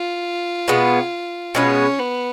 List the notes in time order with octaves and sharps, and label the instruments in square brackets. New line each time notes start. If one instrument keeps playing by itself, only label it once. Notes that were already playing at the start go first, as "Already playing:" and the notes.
Already playing: [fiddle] F4
[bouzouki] B2 G#3 B3
[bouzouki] B2 G#3 B3 [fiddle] C#4
[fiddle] B3